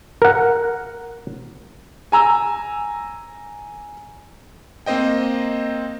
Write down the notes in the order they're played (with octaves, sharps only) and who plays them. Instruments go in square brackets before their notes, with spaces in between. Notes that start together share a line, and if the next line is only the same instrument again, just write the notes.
[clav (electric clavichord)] A#4 F#5
[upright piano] G#5 A#5 E6
[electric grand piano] A#3 C4 C5 D#5 G5